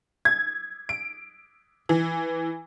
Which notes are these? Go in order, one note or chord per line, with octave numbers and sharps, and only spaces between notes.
G#6
D7
E3